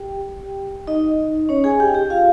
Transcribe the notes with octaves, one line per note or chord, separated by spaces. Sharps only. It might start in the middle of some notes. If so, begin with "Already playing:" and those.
Already playing: G4 G5
D#4 D#5
C#4 C#5
G#4 G#5
G4 G5
G4 G5
F4 F5